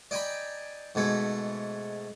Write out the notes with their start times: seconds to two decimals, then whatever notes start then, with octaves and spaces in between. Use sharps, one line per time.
0.11 D5 D#5 G5 G#5 A#5 B5
0.95 G#2 B2 A3 G#4